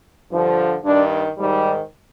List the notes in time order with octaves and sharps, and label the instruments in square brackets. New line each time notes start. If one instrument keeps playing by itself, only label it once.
[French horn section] G2 D3 F3
G2 D#3 D4
G#2 D#3 G3